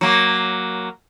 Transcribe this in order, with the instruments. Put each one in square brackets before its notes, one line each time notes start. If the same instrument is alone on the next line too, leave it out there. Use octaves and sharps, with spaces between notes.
[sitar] F#3 A#3